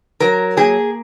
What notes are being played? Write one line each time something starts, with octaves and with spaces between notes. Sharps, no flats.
F#3 A#4
A#3 G#4